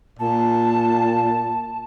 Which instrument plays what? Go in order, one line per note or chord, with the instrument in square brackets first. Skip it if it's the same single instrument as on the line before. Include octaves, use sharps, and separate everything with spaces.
[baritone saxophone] A#2 [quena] A5